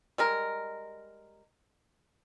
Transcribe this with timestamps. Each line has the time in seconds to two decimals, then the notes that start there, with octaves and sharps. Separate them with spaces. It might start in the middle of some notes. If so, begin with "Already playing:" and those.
0.18 G3 G#3 A#4